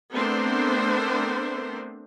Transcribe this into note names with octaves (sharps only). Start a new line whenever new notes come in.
A3 B3 C4 D4 A#4 C5